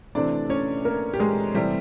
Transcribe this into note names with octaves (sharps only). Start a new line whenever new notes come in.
C3 E3 A3 C4 D4 D5
C#4 C#5
A#3 A#4
G4
G#3 G#4
C3 E3 G3 A3 C4 G4